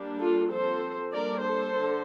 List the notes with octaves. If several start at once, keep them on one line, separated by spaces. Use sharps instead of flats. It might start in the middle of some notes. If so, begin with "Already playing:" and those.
Already playing: G3 A#3 D4
F4 A4
F3 C4 A4 C5
G3 A#3 D4 A#4 D5
A4 C5
D3